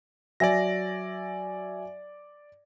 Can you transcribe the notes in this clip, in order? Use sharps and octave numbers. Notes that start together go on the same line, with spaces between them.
F#3 D5 E5 G#5 A#6